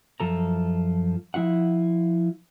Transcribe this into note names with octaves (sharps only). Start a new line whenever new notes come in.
F#2 F3 A4 A#5
F3 E4 F4 F#5